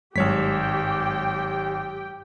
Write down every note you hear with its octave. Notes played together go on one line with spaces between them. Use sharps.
G#1 G2 F#3 G#3 G4 C#5 G5 B6